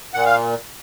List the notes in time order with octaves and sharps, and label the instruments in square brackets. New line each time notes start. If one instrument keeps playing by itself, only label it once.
[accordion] A#2 F#5
F5